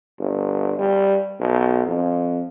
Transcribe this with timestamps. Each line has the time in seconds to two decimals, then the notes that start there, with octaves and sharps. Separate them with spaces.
0.19 G1
0.79 G3
1.40 B1
1.86 F2